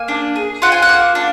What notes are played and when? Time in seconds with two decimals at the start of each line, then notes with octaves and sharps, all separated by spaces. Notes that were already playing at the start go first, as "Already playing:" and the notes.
Already playing: A#3 G#5
0.08 D4
0.36 G#4
0.62 F4 F#5
0.72 G#5
0.82 F#5
0.89 A#3
1.15 D4